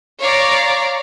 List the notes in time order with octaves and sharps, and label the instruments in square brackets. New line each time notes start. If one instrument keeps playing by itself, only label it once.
[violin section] C#5 D5 F5 A#5 D6